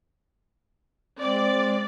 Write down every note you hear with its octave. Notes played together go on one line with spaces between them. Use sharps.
G#3 C4 D5